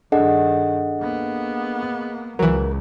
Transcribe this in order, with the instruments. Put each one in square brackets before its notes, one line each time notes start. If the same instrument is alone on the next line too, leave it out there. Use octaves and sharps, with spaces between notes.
[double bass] G2 D#3 [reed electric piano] D4 A4 [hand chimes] G#4 D#5 F#5
[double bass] A#3 B3
[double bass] C#2 [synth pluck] E3 F#3 [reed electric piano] A#4